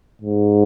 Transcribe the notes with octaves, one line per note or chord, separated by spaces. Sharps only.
G#2